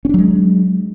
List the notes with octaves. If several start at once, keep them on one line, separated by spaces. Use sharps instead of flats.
F#3 G#3 C#4 D4